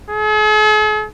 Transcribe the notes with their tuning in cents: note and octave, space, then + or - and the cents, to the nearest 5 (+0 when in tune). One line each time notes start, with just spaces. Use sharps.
G#4 +45